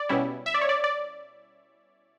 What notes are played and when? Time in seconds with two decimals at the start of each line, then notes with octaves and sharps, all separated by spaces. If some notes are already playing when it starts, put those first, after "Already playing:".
Already playing: D5
0.09 B2 G3 C#4 E4
0.46 E5
0.54 D5
0.61 C#5
0.69 D5
0.84 D5